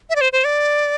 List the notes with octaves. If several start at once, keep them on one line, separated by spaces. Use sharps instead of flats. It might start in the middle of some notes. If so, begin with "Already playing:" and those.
E5
D5
C5
C5
D5